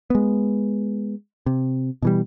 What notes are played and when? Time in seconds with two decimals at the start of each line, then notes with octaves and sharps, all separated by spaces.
0.10 G#3 B3
1.46 C3
2.02 B2 E3 G3